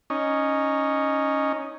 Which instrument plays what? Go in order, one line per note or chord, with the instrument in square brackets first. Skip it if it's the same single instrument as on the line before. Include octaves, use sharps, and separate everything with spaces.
[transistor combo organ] C#4 D#4